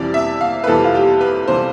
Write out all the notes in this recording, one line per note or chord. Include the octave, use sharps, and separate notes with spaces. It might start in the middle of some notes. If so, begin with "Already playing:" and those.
Already playing: F2 C3 E3 G3 D5
E5
F5
B4
F2 C3 E3 G3 A4
F4
G4
B4
C3 E3 G3 C5